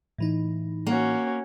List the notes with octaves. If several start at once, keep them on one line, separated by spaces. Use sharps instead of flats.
A2 E3 D#4
A#3 C#4 F#4